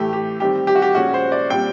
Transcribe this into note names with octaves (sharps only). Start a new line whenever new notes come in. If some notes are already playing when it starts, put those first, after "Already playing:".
Already playing: A2 E3 A3 G4
G4
D#3 G3 C4 G4
G4
F#4
G4
A#2 F3 G#3 C#4 F#4
C5
D5
A#2 G3 C4 G5